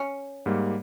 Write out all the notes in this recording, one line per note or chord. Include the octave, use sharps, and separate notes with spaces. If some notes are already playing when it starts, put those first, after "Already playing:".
Already playing: C#4
G#2 G3 A#3